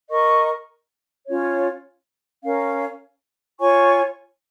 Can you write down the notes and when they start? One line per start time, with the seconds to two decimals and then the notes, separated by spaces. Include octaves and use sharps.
0.10 A#4 D#5 C#6
1.26 C#4 F4 C#5
2.44 C#4 A#4 F5
3.60 F4 C#5 G#5 C#6